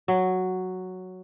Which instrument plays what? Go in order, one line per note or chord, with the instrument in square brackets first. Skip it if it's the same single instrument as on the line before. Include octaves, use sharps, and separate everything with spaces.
[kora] F#3